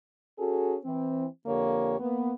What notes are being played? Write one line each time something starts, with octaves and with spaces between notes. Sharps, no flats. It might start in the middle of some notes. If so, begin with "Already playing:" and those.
C#4 F#4 G#4 A4
E3 C4
F2 D3 A#3 G4 C#5
A#3 B3